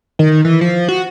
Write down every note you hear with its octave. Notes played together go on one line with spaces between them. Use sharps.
D#3
E3
F3
F#4